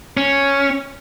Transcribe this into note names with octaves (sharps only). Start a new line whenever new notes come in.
C#4